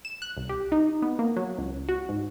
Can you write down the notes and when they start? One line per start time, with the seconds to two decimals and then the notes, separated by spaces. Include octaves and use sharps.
0.05 E7
0.22 F#6
0.37 C2
0.49 G4
0.72 D#4
1.02 B3
1.19 A#3
1.37 F#3
1.58 C#2
1.89 F#4
2.09 G#2